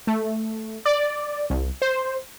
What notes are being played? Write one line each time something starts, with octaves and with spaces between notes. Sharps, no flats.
A3
D5
C2
C5